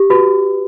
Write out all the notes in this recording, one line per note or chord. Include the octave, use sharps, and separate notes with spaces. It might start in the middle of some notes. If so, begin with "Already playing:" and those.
Already playing: G4
F#4 B4